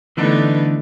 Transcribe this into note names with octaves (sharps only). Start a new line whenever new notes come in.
D3 E3 A3 B3 D4 D#4